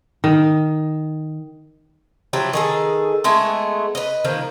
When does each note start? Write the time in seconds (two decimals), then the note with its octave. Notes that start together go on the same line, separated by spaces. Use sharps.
0.24 D#3
2.33 F3 F#3 E4 G4
2.53 D#3 G#4 A4
3.24 G#3 A3 B3 E4
3.95 B4 D#5
4.25 D#3 F3 A#3